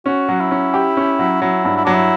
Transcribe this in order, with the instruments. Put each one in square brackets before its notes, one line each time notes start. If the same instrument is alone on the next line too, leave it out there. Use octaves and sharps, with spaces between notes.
[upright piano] C#4 [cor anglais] F#4
[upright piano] F#3
[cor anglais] E4
[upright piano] C#4
G4
C#4
F#3
[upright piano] F#3 [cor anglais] E4
[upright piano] G2
[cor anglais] E4
[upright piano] F#3 [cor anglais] D4
[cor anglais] E4